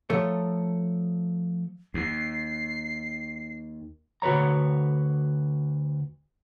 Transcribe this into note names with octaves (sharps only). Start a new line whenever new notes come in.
F3 A3 A4 A#4 C#5
D#2 C7
D2 F#4 B4 C#5 A#5